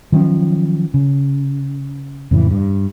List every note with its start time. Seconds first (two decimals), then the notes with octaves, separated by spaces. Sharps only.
0.12 D#3 F3 F#3 C#4
0.94 C#3
2.31 F2 A2 C#3 E3
2.51 G2